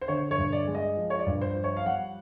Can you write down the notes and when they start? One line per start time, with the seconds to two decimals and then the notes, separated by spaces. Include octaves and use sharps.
0.01 C5
0.08 D3 C#5
0.31 C#5
0.38 G2
0.53 D5
0.67 G#3
0.75 D#5
0.97 F3
1.10 C#5
1.19 D5
1.26 G2
1.41 C5
1.56 F3
1.64 C#5
1.77 F5
1.86 G3 F#5